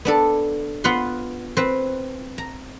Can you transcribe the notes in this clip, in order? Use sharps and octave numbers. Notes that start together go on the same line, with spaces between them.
B3 D4 A4
B3 F4 B4 F#5 C6
C4 B4
A#5